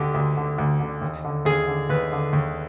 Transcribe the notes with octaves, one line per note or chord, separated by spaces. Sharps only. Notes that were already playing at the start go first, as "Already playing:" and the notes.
Already playing: D2 D3 G4
D2
D3
D2
D3
D#2
D3
D#2 G#4
D3
D#2 B4
D3
D#2